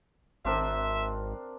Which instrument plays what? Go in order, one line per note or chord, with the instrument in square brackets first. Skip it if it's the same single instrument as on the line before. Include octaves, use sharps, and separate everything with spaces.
[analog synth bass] G#1 [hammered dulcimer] C4 D4 A#4 [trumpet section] E5